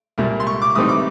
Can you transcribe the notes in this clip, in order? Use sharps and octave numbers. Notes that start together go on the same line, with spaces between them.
C2 A#2 G3 A#3
C6
C#6
D6
A2 E3 G3 C4 D#4 D#6
D6